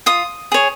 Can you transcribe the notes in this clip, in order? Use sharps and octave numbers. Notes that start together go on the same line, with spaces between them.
F4 D#6
G#4 C#5